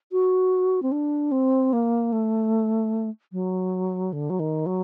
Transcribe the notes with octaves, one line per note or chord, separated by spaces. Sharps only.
F#4
C4
D4
C4
A#3
A3
F#3
D3
F#3
D#3
F#3